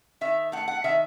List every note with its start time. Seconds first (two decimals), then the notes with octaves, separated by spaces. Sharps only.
0.21 D#3 E5
0.52 A3 F#5
0.68 F#5
0.84 D#3 E5